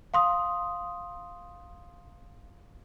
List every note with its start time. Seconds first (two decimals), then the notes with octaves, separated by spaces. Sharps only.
0.14 F5 C6 D#6